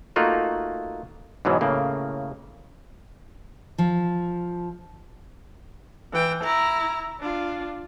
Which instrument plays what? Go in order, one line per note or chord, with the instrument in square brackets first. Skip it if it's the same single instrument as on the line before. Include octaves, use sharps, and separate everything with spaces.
[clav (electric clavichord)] A3 A#3 D#4 F4 F#4
G#2 B2 E3 F#3
A2 C#3 A#3
[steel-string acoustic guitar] F3
[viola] E3 G5
E4 A#5
D4 F4